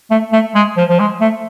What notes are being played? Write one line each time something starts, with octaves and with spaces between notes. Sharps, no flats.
A3
A3
G#3
F3
F3
G#3
A3